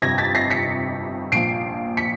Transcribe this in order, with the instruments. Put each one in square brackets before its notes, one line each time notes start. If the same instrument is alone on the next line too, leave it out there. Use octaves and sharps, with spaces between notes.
[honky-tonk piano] G1 F2 C3 G#6 A#6
A6 B6
A#6 C7
B6 C#7
A#1 A#2 F3 C7 D7
B6 C#7